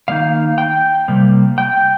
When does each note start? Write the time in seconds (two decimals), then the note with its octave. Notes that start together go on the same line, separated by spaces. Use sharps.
0.08 D#3 A#3 D#4 F5
0.58 G5
1.08 C3 G3 A#3
1.58 G5